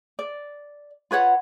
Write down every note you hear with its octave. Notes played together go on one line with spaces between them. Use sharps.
D5
F4 B4 C#5 F#5